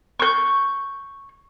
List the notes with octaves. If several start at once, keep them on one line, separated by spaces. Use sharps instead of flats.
C#6 G6